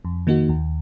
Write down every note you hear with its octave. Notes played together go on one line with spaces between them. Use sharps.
F2
D#3 A#3 D#4 F#4
D#2